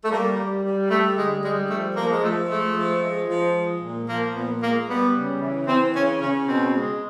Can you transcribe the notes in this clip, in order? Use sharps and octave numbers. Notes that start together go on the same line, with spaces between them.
A3
G3 A#3
G3
G3
G3 A3
D3 G#3
G3 G#3
F3 A3
F3 A#3
G#3
F3 A3
G#3 A3
F3
G#3
F3
G#3
A#2
F3 A#3
A#2 B3
G#3 A#3
G3 B3
C#3
E3
E3 C4
C#3 C#4
C#3 C#4
B2 C4
G#3